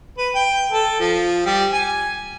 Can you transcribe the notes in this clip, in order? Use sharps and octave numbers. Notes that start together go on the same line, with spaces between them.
B4
G5
A4
F3
G3
G#5